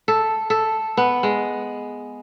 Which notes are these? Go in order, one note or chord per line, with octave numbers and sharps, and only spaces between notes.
A4
A4
B3
G#3